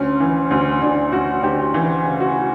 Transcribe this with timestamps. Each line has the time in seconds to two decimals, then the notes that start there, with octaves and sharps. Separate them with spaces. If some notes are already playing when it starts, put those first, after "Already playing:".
Already playing: D2 C#4
0.20 E3
0.51 D2
0.81 D2 D4
1.12 D2 F#4
1.43 D2 G4
1.74 E3
2.05 C#3
2.20 F#4